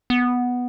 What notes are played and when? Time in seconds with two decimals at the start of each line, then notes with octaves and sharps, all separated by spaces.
0.10 B3